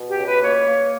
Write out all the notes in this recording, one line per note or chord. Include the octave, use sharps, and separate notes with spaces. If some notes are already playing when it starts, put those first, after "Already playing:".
Already playing: B2
G4
C#2
B4
A#3 C#5
A#3